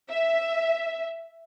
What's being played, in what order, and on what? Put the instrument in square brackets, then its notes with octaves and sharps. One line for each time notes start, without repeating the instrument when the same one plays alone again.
[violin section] E5